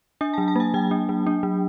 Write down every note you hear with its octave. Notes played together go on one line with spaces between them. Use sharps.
D4 G#5
F#3 A5
A5
A#3 G#5
F#3 G5
D4
F#3
D4
F#3